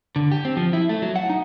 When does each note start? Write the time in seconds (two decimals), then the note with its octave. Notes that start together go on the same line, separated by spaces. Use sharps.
0.16 D3
0.32 G4
0.45 C4
0.57 F3
0.73 E4
0.89 A3
1.02 F#3
1.16 F#5
1.30 D#4